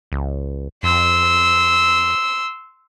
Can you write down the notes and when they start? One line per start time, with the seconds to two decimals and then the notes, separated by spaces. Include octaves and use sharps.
0.12 C#2
0.83 F2 C6 E6